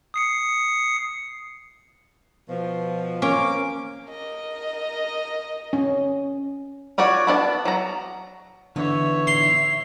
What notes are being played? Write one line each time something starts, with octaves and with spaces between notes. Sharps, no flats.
D#6 C7 C#7
B2 F3
A#3 C#4 D6
A#4 D#5
C#4
F4 F#4 C#5 D5
B3 D4 F5 A5
F#3 A#5
D3 E3 B3 D#4 C#5 E5
C6